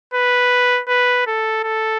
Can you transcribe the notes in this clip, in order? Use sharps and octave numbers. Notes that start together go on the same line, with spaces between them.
B4
B4
A4
A4